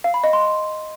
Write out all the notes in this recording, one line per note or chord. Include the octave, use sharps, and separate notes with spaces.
F5
B5
D#5
C6